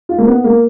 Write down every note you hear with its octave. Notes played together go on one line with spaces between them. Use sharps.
F4
A#3
B3
A#3